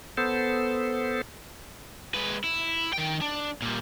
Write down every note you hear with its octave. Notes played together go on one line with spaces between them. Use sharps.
B3 A4 C5
G#3 B4
E4
D#3 G5
D4
A#2 G3